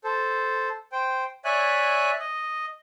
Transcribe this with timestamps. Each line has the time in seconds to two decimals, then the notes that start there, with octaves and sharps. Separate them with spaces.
0.04 A4 C5
0.92 C5 G5
1.45 C#5 D5 E5 G#5 F#6
2.20 D#5